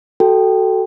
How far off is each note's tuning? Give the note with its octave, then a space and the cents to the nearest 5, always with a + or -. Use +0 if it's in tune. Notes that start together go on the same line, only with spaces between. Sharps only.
F#4 +20 A4 +0 G5 +0